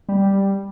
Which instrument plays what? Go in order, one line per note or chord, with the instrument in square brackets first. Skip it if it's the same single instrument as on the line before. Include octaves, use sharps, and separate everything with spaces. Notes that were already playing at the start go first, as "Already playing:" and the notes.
[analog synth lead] G3